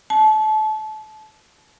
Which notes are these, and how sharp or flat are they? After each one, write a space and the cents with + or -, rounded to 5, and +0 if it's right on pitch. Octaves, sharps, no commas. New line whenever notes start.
A5 -30